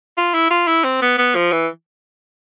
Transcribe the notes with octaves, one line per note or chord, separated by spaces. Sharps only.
F4
E4
F4
E4
C4
B3
B3
F3
E3